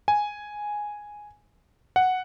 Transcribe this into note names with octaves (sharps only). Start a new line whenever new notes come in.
G#5
F#5